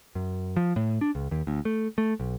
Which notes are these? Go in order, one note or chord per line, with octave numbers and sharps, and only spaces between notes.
F#2
F3
A2
D4
C#2
D#2
D2
A3
A3
B1